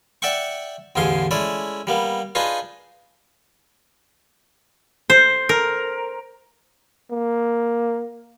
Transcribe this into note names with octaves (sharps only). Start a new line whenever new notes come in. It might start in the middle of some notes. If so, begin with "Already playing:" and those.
D5 E5 F#5 G5 C#6
A1 E2 D3 G#4 F5 C6
G#3 A3 C#4 E4 D5
G3 A#3 B3
D4 D#4 F4 G#4 B4
C5
A#4
A#3